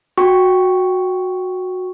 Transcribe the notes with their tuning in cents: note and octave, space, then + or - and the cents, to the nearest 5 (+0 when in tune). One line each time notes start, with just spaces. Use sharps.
F#4 -10 G5 +0 C#6 +0